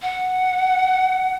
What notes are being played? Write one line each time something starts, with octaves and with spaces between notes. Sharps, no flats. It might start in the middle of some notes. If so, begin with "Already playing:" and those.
F#5